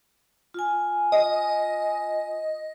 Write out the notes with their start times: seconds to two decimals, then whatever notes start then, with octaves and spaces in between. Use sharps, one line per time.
0.54 F4 G#5
1.12 D#5